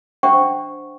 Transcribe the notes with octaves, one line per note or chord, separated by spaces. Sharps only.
D4 C5 E5 F#5 G5 C#6